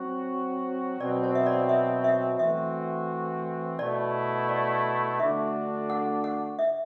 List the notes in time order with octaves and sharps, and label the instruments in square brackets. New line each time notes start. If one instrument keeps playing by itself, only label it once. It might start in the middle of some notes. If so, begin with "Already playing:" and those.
Already playing: [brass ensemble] F#3 C4 F#4
[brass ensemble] B2 F#3 C4 [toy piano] D5
[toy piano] C5
E5
D5
E5
E5
[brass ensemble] E3 A3 C4 F#4 [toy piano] E5
[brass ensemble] B2 A3 E4 [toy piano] D5
[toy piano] D5
[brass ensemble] D3 A3 D4 F#4 [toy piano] E5
[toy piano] F#5
F#5
E5